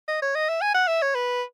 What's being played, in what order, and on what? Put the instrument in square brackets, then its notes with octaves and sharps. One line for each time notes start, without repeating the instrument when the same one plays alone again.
[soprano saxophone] D#5
C#5
D#5
E5
G#5
F#5
E5
C#5
B4